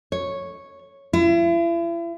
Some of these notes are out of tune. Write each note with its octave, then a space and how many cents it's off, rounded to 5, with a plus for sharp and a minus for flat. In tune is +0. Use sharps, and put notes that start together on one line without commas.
C#5 -5
E4 +40